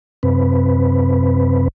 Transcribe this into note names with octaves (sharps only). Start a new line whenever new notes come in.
F#2 C3 C4 B4